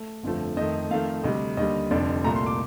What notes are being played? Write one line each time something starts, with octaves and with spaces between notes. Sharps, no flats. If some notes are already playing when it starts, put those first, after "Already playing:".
Already playing: A3
G1 F2 D3 F3 A3
F2 D#3 A3 D#5
F2 D#3 A3 F5
D2 C3 G3 D#5
D#2 D3 G3 D#5
F1 F2 D3 D5
C2 A#2 A3 A#5
C6
D6